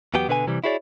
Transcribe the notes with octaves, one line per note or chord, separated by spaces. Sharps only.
E2 F#3 B3 G4 G5
B2 D3 B4 C#5 G#5
C3 E3 G3
E4 F#4 G#4 C#5 D5